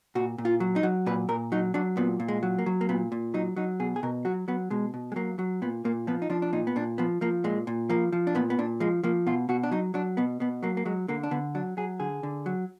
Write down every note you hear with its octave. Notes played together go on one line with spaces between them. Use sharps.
A#2 F#4
A#2
F4
F#3
D#4
F#3
A#2 B4
A#2 A#4
F#3 D#4
F#3 D4
A#2 B3
A#2
G#3
F#3
A#3
F#3
A#3
A#2 B3
A#2
F#3 D#4
F#3 D#4
B2 G#4
G#4
B2 A#4
F#3 F#4
F#3 B3
B2 G#3
B2
G#3
F#3 A#3
F#3
A#2 B3
A#2 A#3
F3 B3
D#4
F3 D4
D4
A#2 D#4
B3
A#2 D4
F3 B3
F3 A#3
A#2 G#3
A#2
F3 A#3
F3
D4
A#2 B3
B3
A#2 D4
F3 G#3
F3 A#3
B2 F4
B2 F#4
D4
F#3 D#4
F#3 D4
B2 B3
B2 B3
F#3 A#3
A#3
F#3 G#3
D3 A#3
D4
D3 B3
F#3 D4
F#3 G#4
D3 G#4
D3
F#3